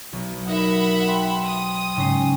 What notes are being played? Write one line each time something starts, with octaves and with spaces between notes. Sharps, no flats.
B1
D#4 A#4 E5 F#5 B5
G5 C6
D#6
G#2 C#3 G#3 C#4 G5